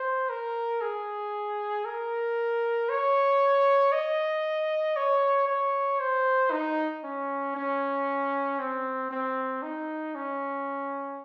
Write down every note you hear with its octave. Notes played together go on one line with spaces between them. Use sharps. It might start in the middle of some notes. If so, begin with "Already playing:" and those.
Already playing: C5
A#4
G#4
A#4
C#5
D#5
C#5
C#5
C5
D#4
C#4
C#4
C4
C4
D#4
C#4